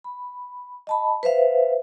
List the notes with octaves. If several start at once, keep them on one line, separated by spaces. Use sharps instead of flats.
B5
D#5 A5 B5
B4 C5 E5 F5